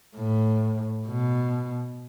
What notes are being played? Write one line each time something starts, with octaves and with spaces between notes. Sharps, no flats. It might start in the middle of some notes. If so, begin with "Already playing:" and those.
A2
B2